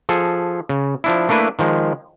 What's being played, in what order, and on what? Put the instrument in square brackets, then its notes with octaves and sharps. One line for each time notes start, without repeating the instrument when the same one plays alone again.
[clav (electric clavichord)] F3 G#4 A4
C#3
F3 D4 E4
A3 A#3 D4 E4 B4
D#3 F3 G#3